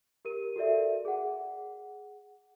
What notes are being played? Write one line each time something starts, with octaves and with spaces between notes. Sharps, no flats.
G4 A#4 D#7
F#4 A4 A#4 D5 E5
G#4 F#5